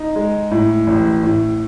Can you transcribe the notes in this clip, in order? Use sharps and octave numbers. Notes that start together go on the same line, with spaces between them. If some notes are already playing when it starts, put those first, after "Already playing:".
Already playing: D#4
G#3
A2
A1
A2